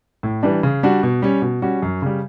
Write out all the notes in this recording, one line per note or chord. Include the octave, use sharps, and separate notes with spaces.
A2
E3 G3 D4
C#3
G3 D4 F#4
B2
G3 C#4
B2
G3 C#4 F#4
F#2
C#3 G3